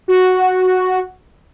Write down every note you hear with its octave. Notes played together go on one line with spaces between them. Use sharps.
F#4